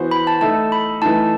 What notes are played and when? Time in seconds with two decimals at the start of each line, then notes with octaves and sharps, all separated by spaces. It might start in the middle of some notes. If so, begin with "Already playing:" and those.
Already playing: E3 B3 F#4 C5
0.11 B5
0.27 A5
0.41 A3 D#4 A4 E5 A5
0.72 B5
1.02 E3 A3 D#4 A5